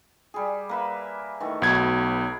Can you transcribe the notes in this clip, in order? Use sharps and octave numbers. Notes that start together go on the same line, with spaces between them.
G3 G#4
A#3 B4 E5
D#3 E3 A3
B1 F#3 A3 B3 G#6